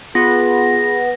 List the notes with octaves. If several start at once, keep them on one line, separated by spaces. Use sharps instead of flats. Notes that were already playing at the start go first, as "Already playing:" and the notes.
B3 F4 G#4 A#6